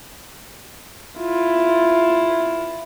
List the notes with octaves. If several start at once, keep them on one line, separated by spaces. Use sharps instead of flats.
E4 F4